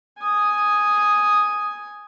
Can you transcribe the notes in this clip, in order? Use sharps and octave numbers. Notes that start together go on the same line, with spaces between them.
G#5 D#6